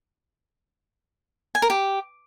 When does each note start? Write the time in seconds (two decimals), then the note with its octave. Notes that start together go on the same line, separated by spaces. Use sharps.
1.55 G#5
1.62 A#4
1.70 G4